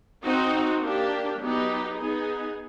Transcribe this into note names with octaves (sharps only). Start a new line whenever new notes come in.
C4 D#4 F#4
A#3 D4 G4
F#3 B3 D#4 G4
B3 D#4 G#4